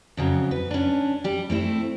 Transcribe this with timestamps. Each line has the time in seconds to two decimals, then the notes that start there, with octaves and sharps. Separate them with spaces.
0.17 F2 C#3 F#3
0.51 B4
0.71 C#4 D4
1.24 G3 G4
1.50 A3 C4 E4